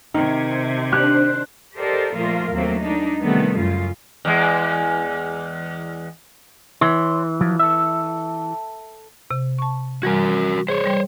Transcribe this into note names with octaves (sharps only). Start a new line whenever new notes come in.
C3 D#3 G#6
D4 G4 C5 F#6
G4 A4 A#4 C5 D5 D#5
A#2 F3 A3 A#3 F4 A#4
D#2 F#3 A3 A#3 C4
G#3 D4 D#4
C3 D#3 E3 G3 A3 B3
F#2 C#3 F4
E2 G#3
E3 C#5 C6
F3 F#3
A4 E5
C3
A5 C#6
E3 G3 F#4 A#4
G#4 C5 C#5
G3 G5